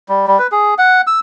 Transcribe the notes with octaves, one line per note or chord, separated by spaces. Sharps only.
G3
G3
B4
G#4
F#5
E6